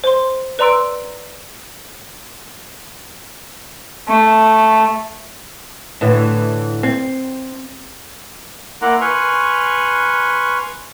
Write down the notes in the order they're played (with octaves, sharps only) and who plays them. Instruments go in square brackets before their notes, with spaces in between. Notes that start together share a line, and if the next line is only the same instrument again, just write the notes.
[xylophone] C5 C6
B4 D5 A#5 C6 E6 D7
[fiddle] A3
[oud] A2 D3 E3
C4
[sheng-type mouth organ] A#3 E4 F#5 A#5 C6 D6
B4 G#5 C6 C#6 F6